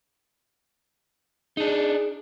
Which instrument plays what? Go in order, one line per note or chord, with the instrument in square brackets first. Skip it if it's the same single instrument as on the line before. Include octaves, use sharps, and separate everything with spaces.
[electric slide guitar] D4 D#4 [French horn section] G#4